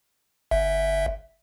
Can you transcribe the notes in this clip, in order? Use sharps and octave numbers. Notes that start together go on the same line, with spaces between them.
G1 E5